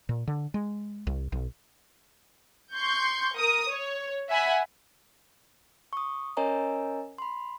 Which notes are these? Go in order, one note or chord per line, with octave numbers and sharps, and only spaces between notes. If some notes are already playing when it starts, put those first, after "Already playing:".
A#2
D3
G#3
C2
B1
C6 C#6 G6
A#4 D#6
C#5
E5 F#5 G#5 B5
C#6 D#6
C#4 A#4 C#5 D#5 G#5 A#5
B5 C6